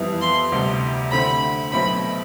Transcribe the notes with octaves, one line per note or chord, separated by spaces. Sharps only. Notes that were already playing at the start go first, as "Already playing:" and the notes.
Already playing: F2 E3 G3 B3 E4
C6
D2 C3 G3
D3 A3 C4 B5
B1 B2 A3 C4 B5